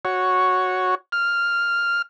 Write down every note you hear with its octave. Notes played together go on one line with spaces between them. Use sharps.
F#4 C#5
F6